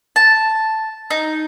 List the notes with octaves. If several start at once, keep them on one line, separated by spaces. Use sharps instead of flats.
A5
D#4